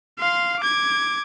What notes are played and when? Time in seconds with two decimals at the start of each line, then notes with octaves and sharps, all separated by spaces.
0.19 F5 C6
0.59 D6 G#6